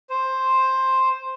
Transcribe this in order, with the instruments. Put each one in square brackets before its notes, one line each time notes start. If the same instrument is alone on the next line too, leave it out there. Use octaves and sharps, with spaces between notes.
[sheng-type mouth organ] C5